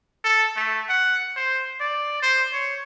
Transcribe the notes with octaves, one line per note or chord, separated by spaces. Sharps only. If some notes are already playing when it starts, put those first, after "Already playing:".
A4
A3
F#5
C5
D5
C5
C#5